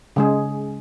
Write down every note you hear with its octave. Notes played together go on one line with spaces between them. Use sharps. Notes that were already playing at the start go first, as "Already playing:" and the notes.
C#3 G#3 G#4